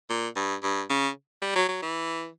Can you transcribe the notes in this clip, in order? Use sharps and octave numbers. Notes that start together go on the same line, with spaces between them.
A#2
G2
G2
C#3
G3
F#3
F#3
E3